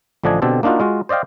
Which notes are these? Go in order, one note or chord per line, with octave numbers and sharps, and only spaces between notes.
A1 D3 F3 D4 D#5 G#5
B2 D3 C4 G4 A4
A#3 D4 D#4 F4 F#4
G#3 F4 F#4
C5 D5 D#5 F5 G5